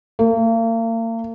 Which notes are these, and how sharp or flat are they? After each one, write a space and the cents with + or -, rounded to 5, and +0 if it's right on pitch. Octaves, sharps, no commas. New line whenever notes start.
A#3 -40